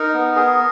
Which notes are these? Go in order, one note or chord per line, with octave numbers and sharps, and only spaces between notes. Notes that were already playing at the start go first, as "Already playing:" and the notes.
Already playing: D#4 A#4
B3
G#4